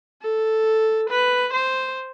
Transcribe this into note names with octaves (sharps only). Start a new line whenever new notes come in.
A4
B4
C5